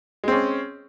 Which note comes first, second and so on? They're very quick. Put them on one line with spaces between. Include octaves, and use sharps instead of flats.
G#3 C4 C#4